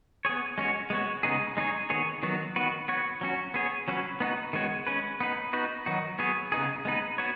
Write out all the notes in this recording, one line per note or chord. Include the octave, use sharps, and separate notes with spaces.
B3 G#4 C#5
G#3 C#4 F#4 C#5
G#3 B3 F#4 C#5
C#3 G#3 B3 D#4 G#4
G#3 D#4 G#4 C#5
D#3 B3 G#4 C#5
D#3 F#3 B3 F#4
D#3 B3 F#4 B4
B3 F#4 C#5
F#3 C#4 F#4
B3 G#4 C#5
F#3 C#4 F#4 B4
B3 D#4 F#4 B4
D#3 G#3 B3 F#4 C#5
G#3 C#4 B4
B3 D#4 B4
B3 D#4 F#4 B4
D#3 F#3 D#4 F#4
F#3 B3 G#4 C#5
C#3 B3 D#4 G#4
G#3 B3 D#4 B4
B3 F#4 C#5